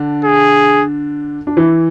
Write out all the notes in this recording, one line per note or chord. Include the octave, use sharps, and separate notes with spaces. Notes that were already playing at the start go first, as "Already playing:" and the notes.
Already playing: D3 D4
G#4
D4
E3 E4